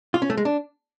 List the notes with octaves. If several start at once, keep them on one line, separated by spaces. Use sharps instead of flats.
F4
C#4
A3
G#3
D4